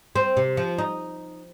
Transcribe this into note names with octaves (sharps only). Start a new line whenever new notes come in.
C4
C3
F3
D#4